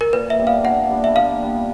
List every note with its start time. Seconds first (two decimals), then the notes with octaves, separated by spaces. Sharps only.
0.01 A#4
0.13 A#2 B4
0.30 E5
0.39 G3 B3 D4
0.47 F5
0.64 A#2 F#5
0.90 G3 B3 D4
1.04 E5
1.15 A#2 F5
1.42 G3 B3 D4